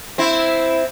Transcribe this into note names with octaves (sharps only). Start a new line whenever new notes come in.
C4 E4